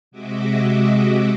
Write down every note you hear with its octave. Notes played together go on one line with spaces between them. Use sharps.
C3 G#3 F#4 D#5 E5 D6